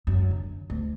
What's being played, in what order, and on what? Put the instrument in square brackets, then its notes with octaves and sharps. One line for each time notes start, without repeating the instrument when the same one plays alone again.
[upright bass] F#2
D3
D2